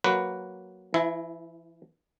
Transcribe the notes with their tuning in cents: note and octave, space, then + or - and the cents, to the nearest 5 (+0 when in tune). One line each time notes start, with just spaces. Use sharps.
F#3 +0 A#3 +0 B4 +0
E3 +35 E4 -5